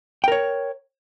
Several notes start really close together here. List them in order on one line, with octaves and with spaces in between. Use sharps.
G5 A#4 C#5